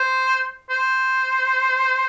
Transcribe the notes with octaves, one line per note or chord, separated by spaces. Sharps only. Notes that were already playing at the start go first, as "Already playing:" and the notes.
Already playing: C5
C5